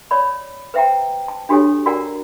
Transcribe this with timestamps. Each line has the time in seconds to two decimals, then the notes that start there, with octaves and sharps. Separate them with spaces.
0.11 C#5 D5 B5
0.74 B4 C5 E5 F#5 G5 A#5
1.28 A5
1.49 D4 F#4 G4 A4 C#5 G#5
1.86 F#4 A#4 D5 F#5 G#5 A#5